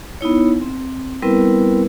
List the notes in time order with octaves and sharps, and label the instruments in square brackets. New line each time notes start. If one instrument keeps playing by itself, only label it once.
[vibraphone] B3 D#4 E4 C#5
C4
G3 B3 C4 E4 A#4 B4